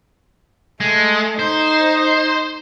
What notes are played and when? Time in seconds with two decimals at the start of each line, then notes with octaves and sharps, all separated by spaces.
0.80 G#3 A3
1.39 D#4 C5